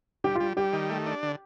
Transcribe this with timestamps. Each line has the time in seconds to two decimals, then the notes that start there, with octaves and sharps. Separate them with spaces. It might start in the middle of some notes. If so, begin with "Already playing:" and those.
0.24 G3 G4
0.35 F4
0.40 G3
0.57 G3 G4
0.73 D#3
0.89 A3
1.06 D4
1.23 D3